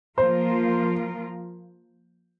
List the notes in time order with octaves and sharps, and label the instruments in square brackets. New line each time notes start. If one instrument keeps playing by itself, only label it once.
[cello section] F3 A#3 F4 A#4 [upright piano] C5